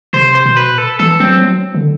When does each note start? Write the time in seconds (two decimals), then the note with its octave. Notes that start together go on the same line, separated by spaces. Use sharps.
0.13 C3 C5
0.35 C5
0.46 B2
0.57 B4
0.78 A4
0.99 E3 A4
1.20 F#3 C4
1.41 F#3
1.74 D3